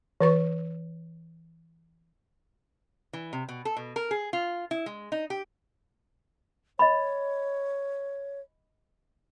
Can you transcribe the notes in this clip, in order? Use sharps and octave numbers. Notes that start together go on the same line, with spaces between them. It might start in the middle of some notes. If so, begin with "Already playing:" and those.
E3 B4 C#6
E3
C3
B2
A4
B2
A#4
G#4
F4
E4
G#3
D#4
G4
C#5 D#5 B5